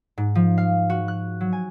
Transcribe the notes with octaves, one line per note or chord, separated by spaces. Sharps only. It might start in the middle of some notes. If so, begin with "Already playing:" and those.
G#2
F3
F5
F#4
F#6
F#3
G#5